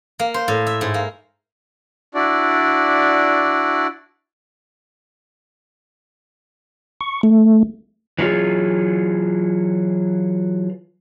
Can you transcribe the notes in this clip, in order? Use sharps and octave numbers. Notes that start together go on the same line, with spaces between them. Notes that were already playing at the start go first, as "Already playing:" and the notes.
A#3
C5
A2
E5
G#2
A#3
D4 E4 F#4 D5
C#6
A3
E3 F#3 G3 F4 G#4